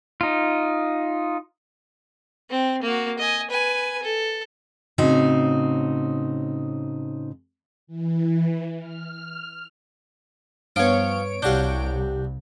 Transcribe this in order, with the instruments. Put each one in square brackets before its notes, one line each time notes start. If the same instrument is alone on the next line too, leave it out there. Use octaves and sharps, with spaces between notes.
[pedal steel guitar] D#4 F4
[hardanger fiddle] C4
A#3 F#4
D#5 G#5
B4 G#5
A4
[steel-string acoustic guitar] A2 C#3 C4 D#4 F#4
[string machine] E3
F6
[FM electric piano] G2 B3 [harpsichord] F3 F4 [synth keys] C#5 D7
[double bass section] C2 [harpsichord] D4 F#4 F5 [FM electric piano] G4 G6